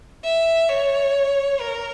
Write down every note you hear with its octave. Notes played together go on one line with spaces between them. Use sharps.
E5
C#5
A#4